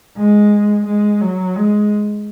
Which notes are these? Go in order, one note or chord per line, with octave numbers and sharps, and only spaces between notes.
G#3
G#3
F#3
G#3